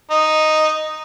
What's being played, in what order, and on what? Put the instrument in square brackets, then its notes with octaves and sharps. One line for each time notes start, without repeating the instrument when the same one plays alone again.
[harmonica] D#4